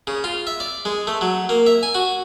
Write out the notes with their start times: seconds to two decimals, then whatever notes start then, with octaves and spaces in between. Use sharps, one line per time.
0.07 C#3
0.24 F4
0.47 E5
0.60 D5
0.85 G#3
1.07 A3
1.21 F#3
1.49 A#3
1.66 E5
1.83 G#5
1.95 F#4